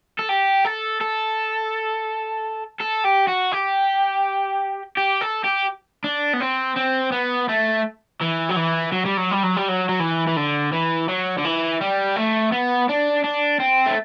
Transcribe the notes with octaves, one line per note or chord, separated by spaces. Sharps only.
A4
G4
A4
A4
A4
G4
F#4
G4
G4
A4
G4
D4
B3
C4
C4
B3
A3
E3
F#3
E3
F#3
G3
F#3
G3
F#3
G3
F#3
F#3
E3
E3
D3
E3
F#3
D3
E3
G3
A3
B3
D4
D4
C4
A3